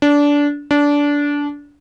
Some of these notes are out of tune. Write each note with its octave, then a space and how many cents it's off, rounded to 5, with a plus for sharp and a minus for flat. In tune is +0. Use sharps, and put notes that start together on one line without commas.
D4 -20
D4 -20